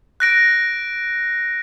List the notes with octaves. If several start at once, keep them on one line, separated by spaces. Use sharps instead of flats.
F#6 A#6 D7